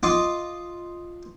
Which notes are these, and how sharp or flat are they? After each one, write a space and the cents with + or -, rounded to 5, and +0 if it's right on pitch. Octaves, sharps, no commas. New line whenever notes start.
F4 +0 D#5 +0 D6 -5